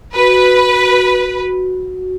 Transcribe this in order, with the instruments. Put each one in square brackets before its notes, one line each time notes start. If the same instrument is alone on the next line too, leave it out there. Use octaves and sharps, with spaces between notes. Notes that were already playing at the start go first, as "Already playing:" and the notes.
[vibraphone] F#4 [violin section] B4